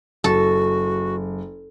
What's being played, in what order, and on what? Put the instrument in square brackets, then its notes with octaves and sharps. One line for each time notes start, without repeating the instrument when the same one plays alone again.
[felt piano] F#1 [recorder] F#4 [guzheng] A4